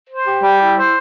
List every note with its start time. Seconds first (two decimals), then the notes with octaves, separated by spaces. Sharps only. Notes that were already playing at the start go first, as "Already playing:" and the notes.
0.09 C5
0.26 G4
0.43 G3
0.60 E4
0.77 C5